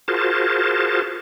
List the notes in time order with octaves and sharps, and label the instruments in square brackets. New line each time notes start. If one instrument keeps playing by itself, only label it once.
[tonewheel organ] F4 F#4 G#4 A#4 C5 A5